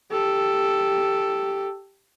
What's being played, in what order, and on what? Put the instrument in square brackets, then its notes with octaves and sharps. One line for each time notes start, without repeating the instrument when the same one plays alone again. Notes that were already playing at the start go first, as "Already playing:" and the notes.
[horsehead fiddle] G4 A4